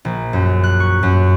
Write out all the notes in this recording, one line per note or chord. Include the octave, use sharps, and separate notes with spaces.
A#1
F#2
F#6
C#6
F#2